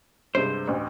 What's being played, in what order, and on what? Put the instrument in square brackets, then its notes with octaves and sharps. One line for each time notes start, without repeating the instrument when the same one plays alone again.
[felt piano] G2 C3 G#3 [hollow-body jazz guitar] C5
[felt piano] A1 D2